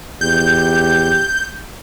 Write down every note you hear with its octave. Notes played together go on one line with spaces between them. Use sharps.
E2 G4 G6